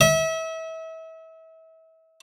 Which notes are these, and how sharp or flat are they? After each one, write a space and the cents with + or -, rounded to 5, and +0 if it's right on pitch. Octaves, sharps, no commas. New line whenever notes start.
E5 -35